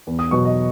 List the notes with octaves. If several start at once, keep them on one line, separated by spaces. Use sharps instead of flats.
E2
D#6
B2 F#3 C#6
D#5